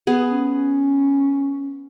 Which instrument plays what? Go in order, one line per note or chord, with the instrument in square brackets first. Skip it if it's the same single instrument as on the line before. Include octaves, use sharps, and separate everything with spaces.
[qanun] B3 G#4
[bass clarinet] C#4